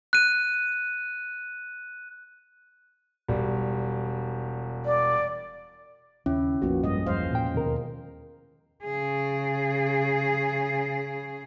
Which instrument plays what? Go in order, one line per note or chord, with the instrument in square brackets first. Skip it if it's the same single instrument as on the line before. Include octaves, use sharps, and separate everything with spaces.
[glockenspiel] F#6 D#7
[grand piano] E1 G3
[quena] D5
[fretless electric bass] D#2 C#3 [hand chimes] C#4 [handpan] E4
[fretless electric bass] A#1 F2 [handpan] F3 A#3 B3 [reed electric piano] F#4
[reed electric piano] G2 [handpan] G#3 D#5
[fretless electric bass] E2 F3 [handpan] G#3 C5 F5
[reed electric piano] A#2 G5
[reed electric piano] D#2 A#4 [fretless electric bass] B2
[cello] C#3 G#4